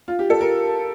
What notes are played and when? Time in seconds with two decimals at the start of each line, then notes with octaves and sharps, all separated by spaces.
0.08 F4
0.19 G4
0.30 A4
0.41 A#4